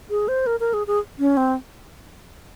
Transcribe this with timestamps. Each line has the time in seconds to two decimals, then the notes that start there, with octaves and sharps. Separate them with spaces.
0.10 G#4
0.28 C5
0.47 A#4
0.60 A#4
0.74 G#4
0.87 G#4
1.19 C#4
1.37 C4